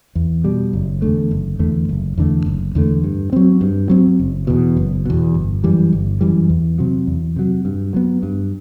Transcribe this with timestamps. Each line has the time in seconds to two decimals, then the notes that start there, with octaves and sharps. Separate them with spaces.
0.15 E2
0.44 B2 G3
0.73 F#1
1.02 E2 D3 A3
1.31 F#1
1.59 E2 D3 A3
1.89 F#1
2.17 E2 D3 A3
2.46 F#1
2.75 E2 D3 A3
3.04 G2
3.33 F#3 C4
3.61 G2
3.89 F#3 C4
4.19 F#1
4.47 E2 B2
4.77 F#1
5.05 E2 B2
5.34 G1
5.63 F#2 E3 G3
5.92 G1
6.21 F#2 E3 G3
6.49 E2
6.78 C3 F#3
7.07 E2
7.36 C3 F#3
7.65 G2
7.94 F#3 B3
8.23 G2